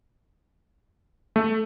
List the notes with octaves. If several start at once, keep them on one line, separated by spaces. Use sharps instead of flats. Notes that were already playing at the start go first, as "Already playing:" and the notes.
A3